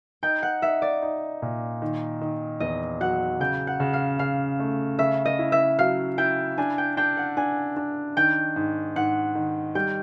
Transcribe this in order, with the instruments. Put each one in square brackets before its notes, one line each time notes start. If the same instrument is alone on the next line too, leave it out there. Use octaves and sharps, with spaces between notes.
[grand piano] D#4 [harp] G5
[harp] F#5
[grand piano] D#4 [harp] E5
[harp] D5
[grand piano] D#4
A#2
D#3
D#3
[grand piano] E2 [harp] D#5
[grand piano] F#3 [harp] F#5
[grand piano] C#3 [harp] G5
[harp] F#5
[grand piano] C#3
[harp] F5
[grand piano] C#3 [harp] F5
[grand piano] A3
[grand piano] C#3 [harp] E5
[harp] D#5
[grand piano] E4
[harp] E5
[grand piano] F#3 [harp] F5
[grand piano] E4 [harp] G5
[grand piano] D4 [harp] G#5
[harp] G5
[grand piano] D4 [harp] G5
[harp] F#5
[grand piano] D4 [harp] G#5
[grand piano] D4
[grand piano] D#3 [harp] G5
[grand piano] G#2
[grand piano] G#2 [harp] F#5
[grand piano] D#3
[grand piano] G3 [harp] G5